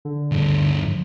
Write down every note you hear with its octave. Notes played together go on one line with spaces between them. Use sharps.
D3
D2 G2